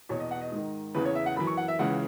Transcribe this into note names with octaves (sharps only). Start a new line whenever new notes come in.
E2 B2 C#5
D#5
F#5
D#5
G#2 D#3
E2 C#3 E3 B4
C#5
E5
F#5
F#2 E3 B5
C#6
F#5
E5
C#2 C#3 E3 F#5